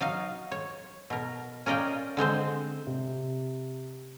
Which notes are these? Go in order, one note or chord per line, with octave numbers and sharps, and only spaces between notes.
F#3 D#4 F5
C#5
B2 A#4
C#4 A#4 D5 D#5 F5 G5
D3 G#3 C4 C5
C3